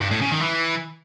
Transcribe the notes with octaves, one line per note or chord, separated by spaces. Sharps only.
G2
A2
C#3
D#3
E3